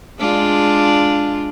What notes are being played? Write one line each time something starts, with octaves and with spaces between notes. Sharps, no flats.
G#3 D4 F4